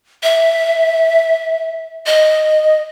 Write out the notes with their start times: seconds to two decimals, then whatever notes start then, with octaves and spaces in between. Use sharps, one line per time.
0.23 E5
2.06 D#5